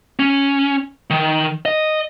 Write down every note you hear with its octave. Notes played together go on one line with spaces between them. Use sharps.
C#4
D#3
D#5